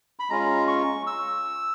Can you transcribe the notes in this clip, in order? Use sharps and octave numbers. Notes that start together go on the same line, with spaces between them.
B5
G#3 C#4 F4 A#5
C#6
E6